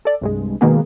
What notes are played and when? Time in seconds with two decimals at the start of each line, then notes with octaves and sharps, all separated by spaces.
0.05 A4 D5
0.21 C2 G2 G#3
0.61 B2 D#3 G#3 A#3 B3 G#4